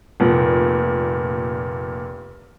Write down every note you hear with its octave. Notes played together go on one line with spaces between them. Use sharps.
F1 A#2